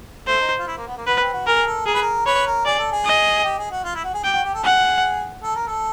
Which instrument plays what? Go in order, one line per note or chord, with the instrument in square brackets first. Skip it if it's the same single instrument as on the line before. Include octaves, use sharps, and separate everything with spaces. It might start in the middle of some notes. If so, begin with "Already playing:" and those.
[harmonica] A3 [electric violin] C5
[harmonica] D#4
F4
E4
A#3
B3
A#3
[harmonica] B3 [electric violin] B4
[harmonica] C4
F#4
[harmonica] G#4 [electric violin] A#4
[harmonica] A4
[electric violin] G#4 [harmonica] A#4
[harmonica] B4
A#4
[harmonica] B4 [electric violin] C#5
[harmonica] A#4
[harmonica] G#4 [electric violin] D5
[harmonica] A4
G#4
[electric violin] D#5
[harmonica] G4
G#4
F#4
F4
E4
F#4
G#4
[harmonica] G4 [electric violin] G5
[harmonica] F#4
G4
A4
[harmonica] G#4 [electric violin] F#5
[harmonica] A4
A#4
A4